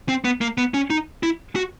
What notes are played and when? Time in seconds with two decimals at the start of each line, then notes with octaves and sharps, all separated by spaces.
0.09 C4
0.25 B3
0.41 A#3
0.58 B3
0.74 C#4
0.90 D#4
1.23 E4
1.56 F#4